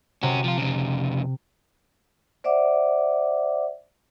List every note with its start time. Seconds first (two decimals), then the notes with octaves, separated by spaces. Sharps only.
0.23 C3 C#4 F#4
0.44 F3 F4
0.58 F2 C#3
2.44 C5 D5 E5 F#5 D6